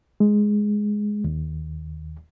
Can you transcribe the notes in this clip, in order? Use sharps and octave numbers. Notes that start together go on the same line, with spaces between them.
G#3
D#2